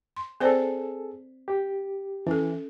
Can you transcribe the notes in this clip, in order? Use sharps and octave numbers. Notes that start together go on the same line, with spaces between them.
C6
C4 G#4 A4 C5 D5
G4
E3 C#4 A4